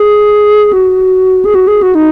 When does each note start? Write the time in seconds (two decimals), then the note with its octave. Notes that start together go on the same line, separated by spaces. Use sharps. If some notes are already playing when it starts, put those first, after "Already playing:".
Already playing: G#4
0.73 F#4
1.45 G#4
1.55 F#4
1.68 G#4
1.82 F#4
1.95 D#4